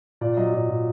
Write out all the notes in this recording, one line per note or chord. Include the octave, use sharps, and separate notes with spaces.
A#2 D5
F#3 D#5
A#2 D5
A#2